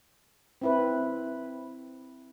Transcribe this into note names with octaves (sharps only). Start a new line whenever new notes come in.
C4 E4 B4